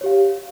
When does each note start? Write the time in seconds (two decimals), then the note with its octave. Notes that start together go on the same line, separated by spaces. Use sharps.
0.01 C#5
0.04 G4
0.06 F5